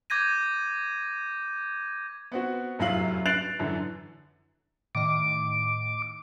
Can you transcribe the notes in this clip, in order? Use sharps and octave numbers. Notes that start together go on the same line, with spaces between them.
D6 G6 G#6 A#6 D#7
B3 C4 F#4
F1 F#2 F#3 E4 F5 F#7
F#6 A6 C7 D7 F7 F#7
F#2 D3 E3
A2 D#3 D#5 D6